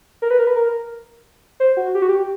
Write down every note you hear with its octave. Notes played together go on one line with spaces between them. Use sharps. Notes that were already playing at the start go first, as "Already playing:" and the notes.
A#4
B4
A#4
B4
A#4
C5
F#4
G4
F#4
G4